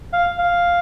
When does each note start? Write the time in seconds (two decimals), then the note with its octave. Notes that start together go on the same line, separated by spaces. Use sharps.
0.13 F5
0.39 F5